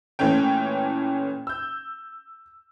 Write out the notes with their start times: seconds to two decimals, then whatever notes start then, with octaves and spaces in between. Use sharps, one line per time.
0.19 A#2 E3 A3 C#4 G5
1.47 E6 G6